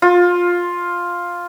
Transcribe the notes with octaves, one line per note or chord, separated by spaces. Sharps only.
F4